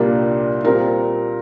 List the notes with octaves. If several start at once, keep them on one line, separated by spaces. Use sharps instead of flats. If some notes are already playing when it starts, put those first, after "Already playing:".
Already playing: C2 A#2 G3 A#3 D4 A#4
A#2 G3 C4 A#4